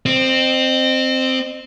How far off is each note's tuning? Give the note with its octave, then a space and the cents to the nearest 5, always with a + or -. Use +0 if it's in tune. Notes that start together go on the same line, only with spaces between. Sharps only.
C4 +0 D#5 -30